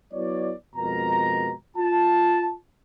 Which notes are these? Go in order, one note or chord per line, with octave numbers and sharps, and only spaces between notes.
F#3 B3 E4 C#5 D5
F2 B2 G#3 A#4 A#5
F4 A5